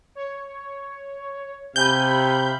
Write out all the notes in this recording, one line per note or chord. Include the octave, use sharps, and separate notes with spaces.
C#5
C3 G4 F5 G#5 B5 G6